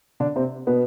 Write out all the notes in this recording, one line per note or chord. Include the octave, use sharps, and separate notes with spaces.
D3 D4
C3 C4
B2 B3